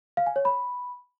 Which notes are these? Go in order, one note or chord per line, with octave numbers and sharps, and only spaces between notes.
F5
G#5
C#5
B5